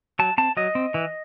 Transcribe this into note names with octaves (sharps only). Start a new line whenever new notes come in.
F#3 A5
C4 A5
F#3 D#5
C4
E3